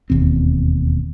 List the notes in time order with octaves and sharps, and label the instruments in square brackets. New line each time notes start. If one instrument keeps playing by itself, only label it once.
[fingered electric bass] E1 D#2 B2 C4